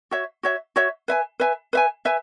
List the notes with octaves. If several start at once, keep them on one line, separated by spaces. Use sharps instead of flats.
F#4 C#5 E5
F#4 C#5 E5
F#4 C#5 E5
B4 E5 G#5
B4 E5 G#5
B4 E5 G#5
B4 E5 G#5